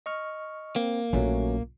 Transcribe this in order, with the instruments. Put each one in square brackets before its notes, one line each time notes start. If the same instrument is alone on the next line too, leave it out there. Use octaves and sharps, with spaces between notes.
[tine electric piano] D#5 C#6 F6
[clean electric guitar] A#3 [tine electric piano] C4
[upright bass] A#1 F4 [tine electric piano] F#3 A3 C#4